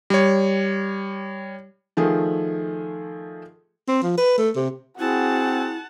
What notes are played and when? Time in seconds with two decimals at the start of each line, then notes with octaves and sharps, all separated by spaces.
0.10 G3 C#5
1.97 D#3 F3 A3 G#4
3.88 C4
4.03 F3
4.18 B4
4.38 A3
4.56 C3
4.99 C4 E4 F#4 G#4 F#5 A5